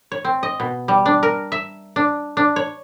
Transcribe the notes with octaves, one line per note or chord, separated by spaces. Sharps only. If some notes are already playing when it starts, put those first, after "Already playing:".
C#5
C4
D#5
B2
G3
D4
A#4
E5
D4
D4
C#5